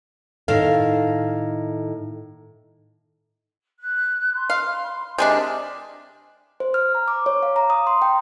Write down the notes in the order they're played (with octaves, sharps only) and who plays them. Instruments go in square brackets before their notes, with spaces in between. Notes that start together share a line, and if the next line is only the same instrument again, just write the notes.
[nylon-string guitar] A2 D#3 A4 F5
[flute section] F#6
B5 C6
[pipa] F5
[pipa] C3 G#3 D4 [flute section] A#4 D#5 E5
[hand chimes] C5
F6
A#5
D6
C#5
F5
A#5
D#6
C6
G5